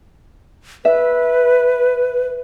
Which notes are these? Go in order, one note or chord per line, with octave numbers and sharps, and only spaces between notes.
B4 E5